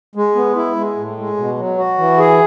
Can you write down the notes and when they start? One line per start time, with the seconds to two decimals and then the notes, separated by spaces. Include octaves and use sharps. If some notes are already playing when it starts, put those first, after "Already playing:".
0.15 G#3
0.35 B3
0.56 E4
0.76 G#3
0.96 A2
1.17 G#3
1.37 B2
1.58 F#3
1.78 F#4
1.98 E3
2.18 G#4